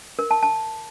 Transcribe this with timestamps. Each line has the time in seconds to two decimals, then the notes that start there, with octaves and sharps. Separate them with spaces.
0.19 A#4
0.31 A5
0.43 A5